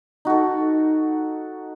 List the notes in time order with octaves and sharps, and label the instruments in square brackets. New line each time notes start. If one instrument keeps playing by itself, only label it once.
[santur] D#4 F#4 A4